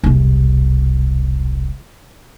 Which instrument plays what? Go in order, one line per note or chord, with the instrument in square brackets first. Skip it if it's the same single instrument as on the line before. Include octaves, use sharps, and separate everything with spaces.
[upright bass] E1 C2